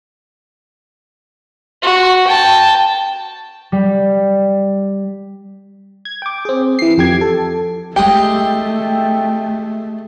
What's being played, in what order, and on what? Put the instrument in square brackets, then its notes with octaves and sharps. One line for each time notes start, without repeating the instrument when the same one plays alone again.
[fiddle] F#4
G5 A5
[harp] G3
[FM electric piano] G#6
G5 D6
C4 G#4
E3 C7
F2 G4 D6 G#6
A4
[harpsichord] G#3 G4 [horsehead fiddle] A3 [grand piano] G5